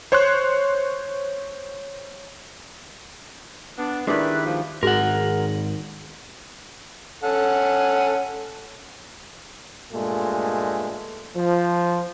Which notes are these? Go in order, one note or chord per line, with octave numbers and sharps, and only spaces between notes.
C5 C#5 C6 C#6 F#6
B3 D4
D#3 G3 G#3 D4 E4 B4
F3
G#1 G#2 F#4 G#4 A#4 F#5
C#4 A4 F#5
G2 A#2 G#3 A3
F3